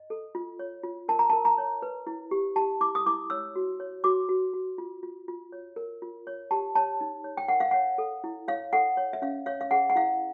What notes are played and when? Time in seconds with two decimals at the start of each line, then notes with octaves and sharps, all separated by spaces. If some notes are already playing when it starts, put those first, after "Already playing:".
Already playing: D#5
0.10 A4
0.35 F4
0.59 C#5
0.83 F4
1.08 A#4 A5
1.19 A#5
1.29 A#4 A5
1.45 A#5
1.58 C#5
1.82 B4
2.07 E4
2.31 G4
2.56 G4 A5
2.81 E4 D6
2.95 D#6
3.06 E4 D6
3.30 C#5 E6
3.56 F#4
3.80 C#5
4.04 F#4 D6
4.29 F#4
4.54 F#4
4.78 F4
5.03 F4
5.28 F4
5.52 C#5
5.76 A#4
6.02 F4
6.27 C#5
6.51 G4 A5
6.75 C#5 A5
7.01 D#4
7.24 C#5
7.37 G5
7.48 A#4 F#5
7.60 F5
7.71 C#5 F#5
7.98 A4
8.24 E4
8.48 C#5 F5
8.73 A4 F#5
8.97 C#5
9.13 E5
9.22 C#4 F5
9.46 C#5 F5
9.61 F5
9.71 G#4 F#5
9.90 F#5
9.95 E4 F5